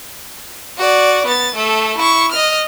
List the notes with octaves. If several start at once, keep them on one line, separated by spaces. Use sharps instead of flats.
F#4 D5
B3 A6
A3 A4
E4 C#6
D#5 F6